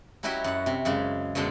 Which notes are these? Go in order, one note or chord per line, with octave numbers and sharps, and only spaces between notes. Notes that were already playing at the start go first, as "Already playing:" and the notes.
F#3 C#4 E4 F#4 G4 D#5
F#2 F#5
C3
F#2 C#3 G#3
F#2 B2 D3 G#3 C6